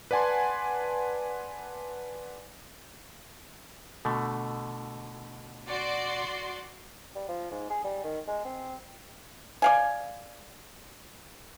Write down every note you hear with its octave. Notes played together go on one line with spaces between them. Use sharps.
B4 D5 F#5 G#5 A5 C6
B2 D3 A3
F#4 D5 C6
G3
F3
G#2
G#4
G3
D#3
G#3
C4
D5 F5 G#5